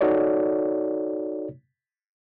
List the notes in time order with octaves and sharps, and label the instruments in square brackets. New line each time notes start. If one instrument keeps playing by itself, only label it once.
[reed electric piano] D#4 F#4 A4 C#5 D5